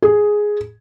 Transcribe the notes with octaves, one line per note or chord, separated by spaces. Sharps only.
G#4